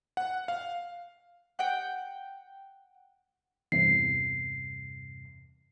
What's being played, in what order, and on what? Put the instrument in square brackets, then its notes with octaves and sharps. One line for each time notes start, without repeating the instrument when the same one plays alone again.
[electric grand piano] F#5
F5
[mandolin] F#5 G5
[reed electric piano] E2 G2 C3 [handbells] C7